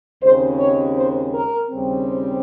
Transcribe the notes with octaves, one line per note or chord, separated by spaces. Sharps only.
D#2 C#3 G#3 C4 C5
C#5
C5
A#4
D#2 C#3 G3 C4
C5